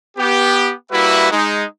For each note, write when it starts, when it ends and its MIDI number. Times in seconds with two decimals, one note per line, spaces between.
0.17 0.73 59
0.17 0.73 67
0.92 1.30 55
0.92 1.30 58
0.92 1.30 64
0.92 1.30 66
0.92 1.30 71
0.92 1.30 76
1.32 1.65 56
1.32 1.65 63